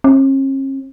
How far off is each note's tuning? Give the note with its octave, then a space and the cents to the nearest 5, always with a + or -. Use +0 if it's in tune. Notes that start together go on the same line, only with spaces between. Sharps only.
C#4 -45